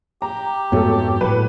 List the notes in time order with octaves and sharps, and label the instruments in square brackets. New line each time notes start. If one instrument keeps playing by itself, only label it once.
[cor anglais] G4 [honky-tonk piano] A#5
[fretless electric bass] F2 G#2 B3 [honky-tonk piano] F#3 A3 A4
[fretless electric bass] A2 F#3 [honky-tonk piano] B4